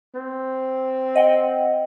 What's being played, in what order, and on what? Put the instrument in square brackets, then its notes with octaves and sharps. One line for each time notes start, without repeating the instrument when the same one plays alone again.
[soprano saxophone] C4
[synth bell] D#5 F#5 G5